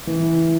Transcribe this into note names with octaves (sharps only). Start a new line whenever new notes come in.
E3